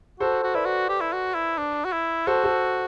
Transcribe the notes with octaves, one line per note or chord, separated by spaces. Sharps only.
F#4 A4 C5
F#4
E4 B4 D5
F#4
G4
E4
F#4
E4
D4
F#4
E4
F#4 A4 C5
A4 C5